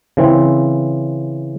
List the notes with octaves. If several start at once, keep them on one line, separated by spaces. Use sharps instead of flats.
C#3 E3 C4